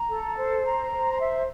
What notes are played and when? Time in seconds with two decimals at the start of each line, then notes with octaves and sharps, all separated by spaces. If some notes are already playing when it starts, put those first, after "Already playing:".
Already playing: A#5
0.10 A4
0.37 C5
0.65 A#5
0.92 C5
1.19 E5